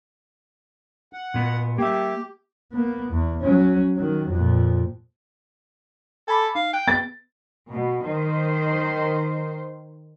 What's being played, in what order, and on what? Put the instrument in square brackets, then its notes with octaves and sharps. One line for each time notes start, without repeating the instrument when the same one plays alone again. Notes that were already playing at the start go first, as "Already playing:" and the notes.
[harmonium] F#5
[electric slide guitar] A#2 B3
[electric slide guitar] A#3 E5 [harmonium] G4
[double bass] A#3 B3
E2
F#3 C#4
D#3 F#3
F2 A#2
[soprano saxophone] A4 [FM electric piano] G#5 B5 D6
[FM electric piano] D#4 [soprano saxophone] F5
[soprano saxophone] G5 [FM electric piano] F#6 G6
[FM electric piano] B3 G#4 B4 [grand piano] A6
[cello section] B2
D#3 C5